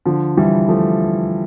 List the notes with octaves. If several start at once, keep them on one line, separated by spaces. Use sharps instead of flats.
D3 F3
E3 G3
F3 A3